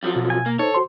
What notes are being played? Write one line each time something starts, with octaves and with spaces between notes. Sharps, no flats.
F2 F3 F#3
B2
G#5
A#3
D#4 A4 C5 C#5
F#4 C5 C6